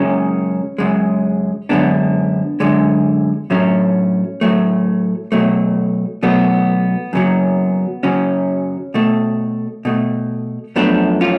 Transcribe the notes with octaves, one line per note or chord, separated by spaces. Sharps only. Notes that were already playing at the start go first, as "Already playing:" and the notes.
Already playing: F#2 C#3 G#3 C#4
F#2 C#3 G#3
F#2 D3 G#3 B3 D4
F#2 D3 G#3
A2 F#3 A3 C#4
A2 F#3 A3
B2 F#3 A3
B2 F#3 A3 B3
F#2 C#3 F#3
F#2 C#3 F#3 C#4
B2 A3
B2 A3
F#2 F3 A3 B3 D4
C#4 F4